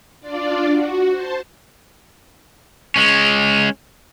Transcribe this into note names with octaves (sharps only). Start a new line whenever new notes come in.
D4 F4 D5
F#4
C5 A5
G#3 C#4